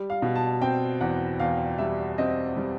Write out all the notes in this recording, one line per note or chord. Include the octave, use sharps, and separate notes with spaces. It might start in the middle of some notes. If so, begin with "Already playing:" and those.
Already playing: G3
F5
B2
A5
C4 G5
E2 F#5
E2 F5
G3 E5
C4 D#5
G3